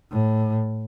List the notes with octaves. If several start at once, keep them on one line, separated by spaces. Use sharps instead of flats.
A2